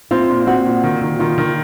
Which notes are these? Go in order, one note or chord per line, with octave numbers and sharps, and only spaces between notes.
C4 F4
A#2
C4 F#4
A#2
D#3
D#3
D#3 F4
D#3